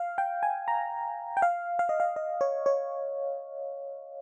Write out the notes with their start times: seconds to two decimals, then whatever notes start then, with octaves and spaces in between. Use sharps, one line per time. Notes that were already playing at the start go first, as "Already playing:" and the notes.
Already playing: F5
0.18 G5
0.43 G#5
0.68 A#5
1.37 G5
1.42 F5
1.79 F5
1.89 D#5
2.00 F5
2.16 D#5
2.41 C#5
2.66 C#5